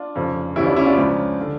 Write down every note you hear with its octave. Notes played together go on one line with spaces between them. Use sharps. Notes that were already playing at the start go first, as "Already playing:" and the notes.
Already playing: D4 F4
F1 F2 C#3 F3
D2 C#3 E3 G3 C#4 E4
D4 F4
C#4 E4
D4 F4
C#2 C#3 F3
D3